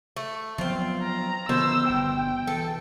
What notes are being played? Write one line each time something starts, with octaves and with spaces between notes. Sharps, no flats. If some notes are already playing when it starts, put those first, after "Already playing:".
A3
F3 F#3 B3 C4 F4
A#5
B2 D3 D#3 F3 C5 E6
G1 G5
E3 A4